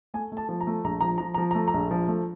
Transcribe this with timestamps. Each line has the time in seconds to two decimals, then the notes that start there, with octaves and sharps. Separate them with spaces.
0.14 A3 G#5
0.32 A3 A5
0.49 F3
0.61 A#5
0.67 A3
0.84 A#1 A#5
1.01 F3 A#5
1.18 F3 A#5
1.34 A#5
1.38 F3
1.51 A#5
1.55 A3
1.68 A#5
1.74 A#1
1.91 F3
2.08 A3